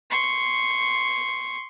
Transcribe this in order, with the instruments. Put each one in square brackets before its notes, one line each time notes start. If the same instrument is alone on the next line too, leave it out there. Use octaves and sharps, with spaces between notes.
[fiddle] C6 C#6